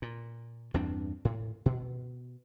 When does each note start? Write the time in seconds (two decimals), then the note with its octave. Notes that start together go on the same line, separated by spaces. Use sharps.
0.02 A#2
0.74 E2 G2 C4 D4
1.25 A2
1.66 B2